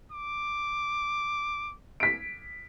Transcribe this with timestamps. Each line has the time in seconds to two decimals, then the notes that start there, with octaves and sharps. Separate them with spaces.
0.12 D6
2.00 B6 D7